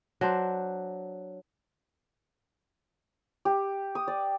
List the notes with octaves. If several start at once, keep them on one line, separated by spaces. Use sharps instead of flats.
F#3 D4 C5
G4
D#6
D5